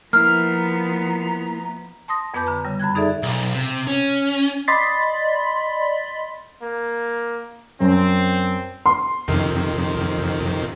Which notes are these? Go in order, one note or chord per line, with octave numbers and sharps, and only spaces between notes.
F3 A#3 B3 E4 A#5 F6
A5 C6 D#6 A#6
F2 B3 B4 D6 G6
D3 A#5
C#3 G3
F#2 B5 F#6 G#6
D#4 G#4 A4 D5 E5
B1
C3
C#4
D5 D#5 B5 C6 A6 B6
A#3
F#2 C4
C6
F2 C3 D#3